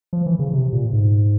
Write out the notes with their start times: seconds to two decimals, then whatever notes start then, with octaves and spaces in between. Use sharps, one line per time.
0.13 F3
0.26 E3
0.39 C#3
0.53 C3
0.72 A#2
0.93 G#2